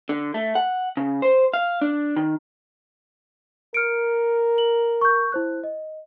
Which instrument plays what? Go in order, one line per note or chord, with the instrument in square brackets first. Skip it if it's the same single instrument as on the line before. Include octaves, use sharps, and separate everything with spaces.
[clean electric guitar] D3
A3
F#5
C#3
C5
F5
D4
D#3
[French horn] A#4 [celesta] F6 C#7 D7
[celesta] F#7
C#6 G6
E4 C5 F#6
D#5